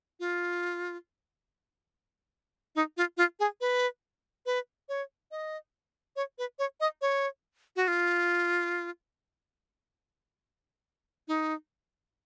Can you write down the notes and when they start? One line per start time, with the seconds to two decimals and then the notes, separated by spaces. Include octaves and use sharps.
0.20 F4
2.75 D#4
2.97 F4
3.17 F4
3.40 G#4
3.61 B4
4.46 B4
4.89 C#5
5.31 D#5
6.16 C#5
6.38 B4
6.59 C#5
6.80 D#5
7.01 C#5
7.76 F#4
7.88 F4
11.28 D#4